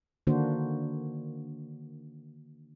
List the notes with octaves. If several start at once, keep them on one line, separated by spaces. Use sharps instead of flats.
D3 D#3 A#3 D4 F#4 C5